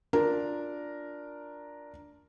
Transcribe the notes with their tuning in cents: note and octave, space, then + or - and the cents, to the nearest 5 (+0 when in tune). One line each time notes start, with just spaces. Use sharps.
D4 +0 F4 +10 A#4 +0